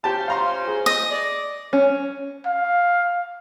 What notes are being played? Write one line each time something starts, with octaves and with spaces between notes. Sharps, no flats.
C#4 F4 G4 C5 A5
F5 A#5 C6
G#4
D#5
D5
C#4
F5